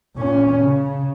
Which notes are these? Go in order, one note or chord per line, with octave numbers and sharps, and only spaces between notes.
A#2 C#4
C#3